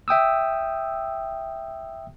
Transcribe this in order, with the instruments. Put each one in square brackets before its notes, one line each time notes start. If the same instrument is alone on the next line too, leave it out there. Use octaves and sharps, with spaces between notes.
[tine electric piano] E5 G5 D#6 E6